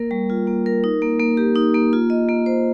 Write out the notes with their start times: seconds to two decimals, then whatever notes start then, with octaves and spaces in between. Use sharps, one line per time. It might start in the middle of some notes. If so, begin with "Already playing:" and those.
Already playing: A#3 A#4
0.11 G3
0.30 F4
0.47 A#3
0.66 A#4
0.84 D#4
1.02 A#3
1.20 A#3
1.37 G4
1.55 D#4
1.74 A#3
1.93 F4
2.10 D#5
2.29 A#3
2.46 C5